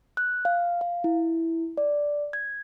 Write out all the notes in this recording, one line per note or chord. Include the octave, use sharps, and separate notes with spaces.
F#6
F5
F5
E4
D5
G#6